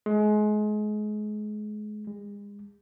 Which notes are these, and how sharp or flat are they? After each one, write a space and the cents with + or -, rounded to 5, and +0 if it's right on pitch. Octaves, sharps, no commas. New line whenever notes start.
G#3 +30
G#3 -35